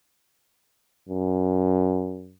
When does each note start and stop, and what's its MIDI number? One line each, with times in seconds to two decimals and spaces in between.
1.09 2.36 42